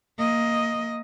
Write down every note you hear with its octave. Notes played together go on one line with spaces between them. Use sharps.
A#3 D#5